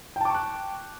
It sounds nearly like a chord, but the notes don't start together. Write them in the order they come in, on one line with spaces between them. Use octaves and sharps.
G5 A5 D6 C#6 F#6